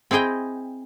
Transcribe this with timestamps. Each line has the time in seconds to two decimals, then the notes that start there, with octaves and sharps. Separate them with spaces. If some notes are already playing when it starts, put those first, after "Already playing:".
0.11 C4 E4 G#4 D#5 G5